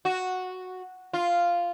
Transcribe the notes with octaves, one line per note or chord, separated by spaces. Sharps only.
F#4
F4